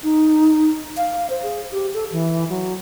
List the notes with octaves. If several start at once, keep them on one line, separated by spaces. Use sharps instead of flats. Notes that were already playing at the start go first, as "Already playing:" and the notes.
D#4
F5
C5
G#4
G4
A4
E3
F#3